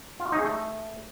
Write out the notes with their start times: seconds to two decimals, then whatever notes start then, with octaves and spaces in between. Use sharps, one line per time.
0.20 F4
0.26 F#4
0.32 D#4
0.38 G#4
0.45 A3